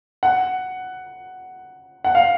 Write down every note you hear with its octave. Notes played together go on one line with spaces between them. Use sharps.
F#5
F#5
F5